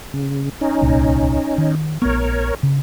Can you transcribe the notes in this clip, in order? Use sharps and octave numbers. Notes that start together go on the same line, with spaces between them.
C#3
C#4 D#4
D1 C2 A#2
D#3
A#1 A3 B3 A#4 C#5
C#3